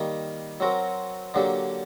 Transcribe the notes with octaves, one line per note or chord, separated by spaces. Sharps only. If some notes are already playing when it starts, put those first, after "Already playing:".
Already playing: D#3 G3 A#3
F#3 C4 F#4 A#4
D3 F#3 A#3 D4 G4